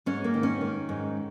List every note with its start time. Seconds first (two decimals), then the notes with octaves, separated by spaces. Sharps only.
0.06 G#2 C#4
0.24 A#3
0.34 D#3
0.43 C#4
0.61 D#3
0.89 G#2